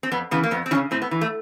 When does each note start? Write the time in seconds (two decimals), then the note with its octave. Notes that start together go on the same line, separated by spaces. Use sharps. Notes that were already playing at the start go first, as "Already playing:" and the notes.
0.03 C4
0.11 F2 B3
0.31 C#3 E3 B3
0.43 A#3
0.51 F2 B3
0.66 C4
0.71 E3 C#4
0.75 C#3
0.91 A2 C4
1.02 B3
1.11 E3
1.21 A3